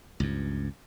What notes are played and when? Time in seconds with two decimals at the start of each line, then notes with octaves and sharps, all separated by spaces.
0.20 C#2 G2